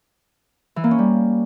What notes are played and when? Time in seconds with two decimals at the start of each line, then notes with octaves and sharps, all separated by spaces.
0.76 E3
0.84 A#3
0.91 C#4
0.98 G3